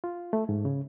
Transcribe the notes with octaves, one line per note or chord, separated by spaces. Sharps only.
F4
A3
G#2
C#3